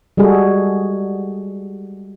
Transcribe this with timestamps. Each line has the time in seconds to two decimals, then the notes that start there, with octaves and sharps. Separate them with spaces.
0.17 G3 G#3 F#4 G#4 A4